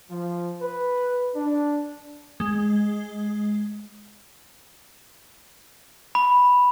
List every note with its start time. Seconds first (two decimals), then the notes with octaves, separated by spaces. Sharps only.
0.10 F3
0.62 B4
1.36 D4
2.40 G#3
6.15 B5